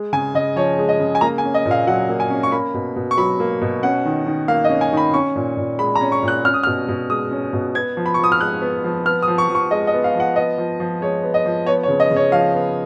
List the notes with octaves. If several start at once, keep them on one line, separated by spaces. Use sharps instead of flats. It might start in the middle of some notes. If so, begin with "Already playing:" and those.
Already playing: G#3
C#3 G#5
C#3 D#5
F3 C#5
G#3
D#5
C#3
G#5
A#3 A#5
G#5
C#4
D#5
A#2
F5
F#3 F#5
A#3
G#5
C#4
C#6
A#3 B5
B2
B2
C#6
F#3 B5
A#3
B2
C#4 F#5
D#3
D#3
A#3 F5
D#5
C#4
G#5
D#3 B5
C#4 C#6
A#2
A#2
G#3 B5
A#5
C#4
C#6
A#2
F#6
C#4 F6
D#6
B2 F6
B2
G#3 D#6
C#4
B2
B3 G#6
F3
B5
C#6
F3 D#6
F6
G#3 F#6
B3
F3
B3 F6
D#6
F3
C#6
F3
C#6
G#3 D#5
D#5
B3
F5
F3
F#5
B3 D#5
F3
F3
G#3 C#5
B3
D#5
F3
B3 C#5
C#5
C#3
D#5
C#3
C#5
F3 F5
B3